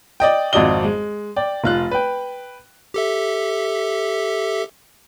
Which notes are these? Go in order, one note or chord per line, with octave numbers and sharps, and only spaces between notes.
D5 D#5 G5
G#1 F2 F#4 D5 D#5 G7
G#3
D5 G5
F1 F4 F#6
B4 G5
G4 A4 E5